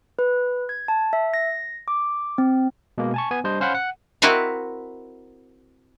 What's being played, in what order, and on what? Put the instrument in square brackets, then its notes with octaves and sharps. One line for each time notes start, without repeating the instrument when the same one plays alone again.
[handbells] B4
G#6
A5
E5
A#6
D6
C4
[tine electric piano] B2 G#3 A#3
G#5 A5 C#6
B3 G#5
G3 D4 C5 D#5
C#4 C5 F5 F#5 B5
F#5
[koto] C4 E4 F#4 A#4 D#5 F5